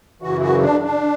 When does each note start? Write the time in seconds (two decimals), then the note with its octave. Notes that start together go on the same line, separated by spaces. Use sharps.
0.22 F#2 C#3 E3 F#4
0.42 F#4
0.62 D4
0.83 D4